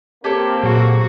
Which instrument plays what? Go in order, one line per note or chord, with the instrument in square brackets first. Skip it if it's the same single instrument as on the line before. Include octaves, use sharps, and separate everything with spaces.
[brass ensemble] A#3 C4 [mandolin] G4 A4 C#5
[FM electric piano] A#2 F#3 G#4 [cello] F#4